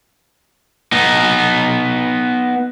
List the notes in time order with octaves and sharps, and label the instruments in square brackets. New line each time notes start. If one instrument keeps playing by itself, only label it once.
[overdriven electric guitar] B3 D#4